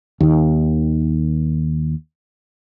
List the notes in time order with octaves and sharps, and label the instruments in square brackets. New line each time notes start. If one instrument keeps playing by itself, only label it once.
[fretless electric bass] D#2 D#3